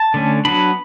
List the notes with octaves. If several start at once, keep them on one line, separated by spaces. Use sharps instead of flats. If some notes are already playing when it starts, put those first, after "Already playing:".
Already playing: A5
D3 A3 C#4
F#3 B3 D4 B5